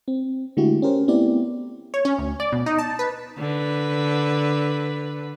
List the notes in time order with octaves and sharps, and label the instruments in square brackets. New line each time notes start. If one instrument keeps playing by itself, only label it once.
[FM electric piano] C4
D3 G#3 A3 E4 F#4 G4
C#4 G4 A#4 C5
A3 B3 C4 E4 G4 D5
[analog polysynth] C#5
C#4
D2
D5
B2
D#4
A5
B4
[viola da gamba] D3 B4